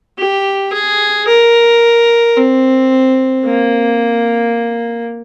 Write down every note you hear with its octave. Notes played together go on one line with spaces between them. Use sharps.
G4
G#4
A#4
C4
A#3